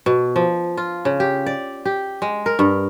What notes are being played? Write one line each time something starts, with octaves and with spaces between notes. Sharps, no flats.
B2
F3
F4
C#3
G4
D5
G4
G#3
A#4
G2